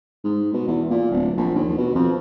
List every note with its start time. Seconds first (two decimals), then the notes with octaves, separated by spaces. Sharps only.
0.24 G#2
0.53 B2
0.67 E2
0.90 A#2
1.11 D1
1.37 A#1
1.55 D#2
1.77 B2
1.95 F2